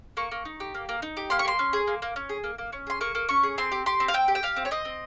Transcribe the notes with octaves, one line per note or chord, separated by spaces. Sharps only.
A#3 C#6
A#3
D#4
G4
A#3
A#3
D#4
G4
A#3 C6
C#6
A#3 C6
C#4
G#4
A#3
A#3
C#4
G#4
A#3
A#3
C#4
G#4 C6
A#3 C#6
A#3
C#4 C#6
G#4
C4 C6
G4
G4 C6
C4
F5
C4 G5
G4
G5
G4 F5
C4
C#5
C4 D#5
C4